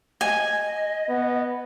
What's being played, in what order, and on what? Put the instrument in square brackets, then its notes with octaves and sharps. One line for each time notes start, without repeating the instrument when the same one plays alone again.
[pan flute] D#5 [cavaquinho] G#5
[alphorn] B3